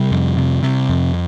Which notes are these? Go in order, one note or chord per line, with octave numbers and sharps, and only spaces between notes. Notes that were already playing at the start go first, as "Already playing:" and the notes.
Already playing: C3 G3
F2
C3
C3
F2